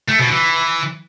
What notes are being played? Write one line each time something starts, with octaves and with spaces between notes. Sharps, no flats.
A3
B2
E3